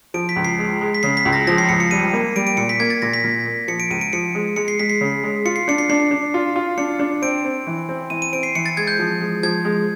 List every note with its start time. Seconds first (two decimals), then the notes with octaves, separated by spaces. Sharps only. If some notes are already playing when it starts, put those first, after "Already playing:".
0.14 F3 D7
0.29 B6
0.36 C#2
0.45 C7
0.59 G#3
0.81 G#3
0.95 B6
1.03 C#3 C7
1.17 B6
1.25 C#2
1.33 A#6
1.47 F3 A#6
1.58 C7
1.69 C#2 C#7
1.80 C#7
1.91 G3 D#7
2.13 A#3
2.36 G3 D7
2.47 D7
2.57 A#2 C#7
2.69 B6
2.80 A#3 G#6
2.90 A6
3.02 A#2 A#6
3.14 B6
3.24 A#2
3.46 A#3
3.68 F3 C#7
3.80 D7
3.90 C#2 D#7
4.01 D7
4.13 F3 C#7
4.35 G#3
4.56 G#3 C#7
4.68 C7
4.79 G#3 B6
4.90 C7
5.01 C#3
5.24 G#3
5.45 F4 C#7
5.56 C7
5.68 D4 C#7
5.78 C7
5.89 D4 C7
6.11 D4
6.34 F4
6.56 F4
6.78 D4 C#7
6.99 D4
7.22 C4 D7
7.45 C4
7.67 E3
7.89 C4
8.10 E3 D#7
8.22 D#7
8.33 C4 D7
8.43 C7
8.55 E3 C#7
8.66 A6
8.77 G#3 G#6
8.87 G6
8.99 F3
9.21 G#3
9.43 F3 G#6
9.65 G#3